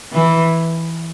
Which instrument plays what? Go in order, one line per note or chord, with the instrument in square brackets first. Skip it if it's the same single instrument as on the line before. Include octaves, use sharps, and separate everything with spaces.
[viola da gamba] E3